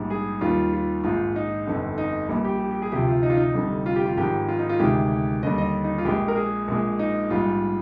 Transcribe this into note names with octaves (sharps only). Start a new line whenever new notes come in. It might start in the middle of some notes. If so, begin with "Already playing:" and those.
Already playing: A#1 G#2 G3
G#4
D#2 D#3 G3 F4
F4
A#1 G#2 D#3 F4
D#4
G1 F2 D3
D#4
A#1 A#2 G3
G4
G4
G4
G#4
D2 C3 F3 G4
F4
D#4
F4
D#4
F1 F2 D3 G3
F4
G4
F4
G#1 G#2 F3 G4
F4
D#4
F4
D2 C3 D#3 G#3 G4
D#2 D3 G3 D#5
D#5
D#4
F4
A#1 A#2 G#3 G4
A#4
G#4
A#1 A#2 G#3
D#4
A#1 G#2 G3 F4